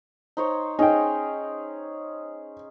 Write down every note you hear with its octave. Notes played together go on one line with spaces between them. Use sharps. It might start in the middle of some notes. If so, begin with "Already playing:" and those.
D#4 C5 C#5
C#4 D#4 G#4 G5